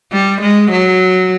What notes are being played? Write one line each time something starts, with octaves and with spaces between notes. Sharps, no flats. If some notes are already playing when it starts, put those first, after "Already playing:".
G3
G#3
F#3